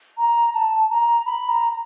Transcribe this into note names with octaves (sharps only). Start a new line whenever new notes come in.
A#5
A5
A#5
B5
A#5